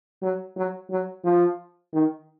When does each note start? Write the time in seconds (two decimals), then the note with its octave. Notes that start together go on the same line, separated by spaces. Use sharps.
0.23 F#3
0.56 F#3
0.91 F#3
1.25 F3
1.94 D#3